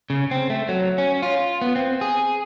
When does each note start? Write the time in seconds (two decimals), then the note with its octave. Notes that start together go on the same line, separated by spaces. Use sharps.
0.10 C#3
0.31 C4
0.50 A3
0.69 F#3
0.98 C#4
1.23 F4
1.62 B3
1.76 C4
2.01 G#4